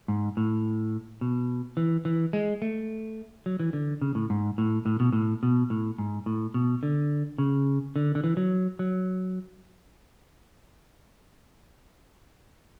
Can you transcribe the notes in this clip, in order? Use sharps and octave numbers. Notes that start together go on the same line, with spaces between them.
G#2
A2
B2
E3
E3
G#3
A3
F#3
E3
D3
C#3
A2
G#2
A2
A2
B2
A2
B2
A2
G#2
A2
B2
D3
C#3
D3
D3
E3
F#3
F#3